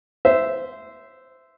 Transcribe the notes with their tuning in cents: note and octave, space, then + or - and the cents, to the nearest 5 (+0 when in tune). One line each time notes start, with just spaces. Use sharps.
C5 -15 E5 +0